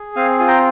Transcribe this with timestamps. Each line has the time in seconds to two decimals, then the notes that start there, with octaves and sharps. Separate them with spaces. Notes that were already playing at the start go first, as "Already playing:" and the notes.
Already playing: G#4
0.16 C4 F5 G#5
0.39 F4 G#5
0.48 G5 A#5